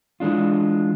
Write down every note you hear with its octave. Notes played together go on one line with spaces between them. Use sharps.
E3 G#3 D4 F4